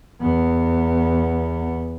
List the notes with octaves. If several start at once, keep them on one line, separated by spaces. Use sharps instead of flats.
E2 B3